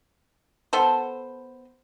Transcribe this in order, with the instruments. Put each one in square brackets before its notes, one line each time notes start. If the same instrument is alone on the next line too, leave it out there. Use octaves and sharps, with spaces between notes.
[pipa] B3 A4 C5